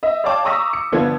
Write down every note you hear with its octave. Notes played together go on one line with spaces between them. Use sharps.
D#5 E5
C#5 D5 F5 G5 A5 D6
A#5 C#6 D#6 E6 A#6 B6
C#7
G1 F3 B3 D4 G#6